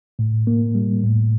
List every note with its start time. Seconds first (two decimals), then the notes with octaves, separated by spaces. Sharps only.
0.19 A2
0.47 A#3
0.75 G3
1.03 A2